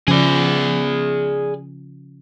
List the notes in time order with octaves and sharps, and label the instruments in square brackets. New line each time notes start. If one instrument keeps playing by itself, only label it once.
[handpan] C#3 F3 C#4 [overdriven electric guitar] G#4 D5